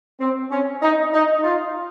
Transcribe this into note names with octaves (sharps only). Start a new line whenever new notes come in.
C4
C#4
D#4
D#4
F4